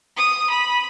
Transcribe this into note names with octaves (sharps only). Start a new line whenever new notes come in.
D#6
B5